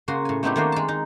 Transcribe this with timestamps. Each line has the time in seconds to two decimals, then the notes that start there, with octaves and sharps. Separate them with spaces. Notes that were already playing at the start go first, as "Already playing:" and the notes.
0.08 C#3 A#3 F#4 C6
0.25 A2 G#5
0.43 A3 B3 C4 D#4 E4 G4
0.56 D#3 A3 A#3 D4 F#4 C5
0.72 G#3 A5
0.88 D#4